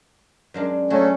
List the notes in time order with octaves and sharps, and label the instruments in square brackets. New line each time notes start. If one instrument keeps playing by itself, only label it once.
[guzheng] F#2 G#3 D4
[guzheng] F#3 [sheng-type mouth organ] A3 C#4